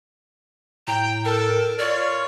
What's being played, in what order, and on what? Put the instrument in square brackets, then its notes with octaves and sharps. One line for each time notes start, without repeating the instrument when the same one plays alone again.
[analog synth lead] A2 [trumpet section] G5 [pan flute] A#5
[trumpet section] A4 [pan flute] A#4
[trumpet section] F4 C#5 [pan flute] D5 [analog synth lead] F6